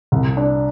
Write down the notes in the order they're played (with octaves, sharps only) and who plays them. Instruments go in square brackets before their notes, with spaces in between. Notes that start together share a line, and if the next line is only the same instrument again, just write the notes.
[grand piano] C2
D4